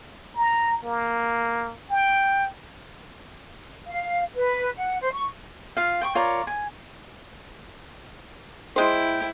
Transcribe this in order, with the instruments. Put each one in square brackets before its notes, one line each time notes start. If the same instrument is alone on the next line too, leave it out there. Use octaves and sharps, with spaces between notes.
[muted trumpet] A#5
A#3
G5
[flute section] F5
B4
F#5
C5
C#6
[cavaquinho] F4 F5
G5 C6 C#6
F4 A#4 C#5 D5
G#5
[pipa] G#3 C5 [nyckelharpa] E4 [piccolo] G5